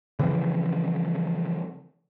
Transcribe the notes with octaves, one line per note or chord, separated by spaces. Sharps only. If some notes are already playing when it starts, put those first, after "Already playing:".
C#3 E3 F3 C4